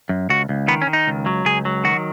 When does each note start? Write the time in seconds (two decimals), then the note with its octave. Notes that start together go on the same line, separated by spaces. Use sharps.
0.09 F#2
0.30 C#2 F#4
0.49 C#2
0.68 D#3 B3
0.82 C#4
0.87 D#3
0.93 D#4
1.07 C#2
1.26 F#3
1.45 C#2 G#4
1.65 F#3
1.84 D#3 F#4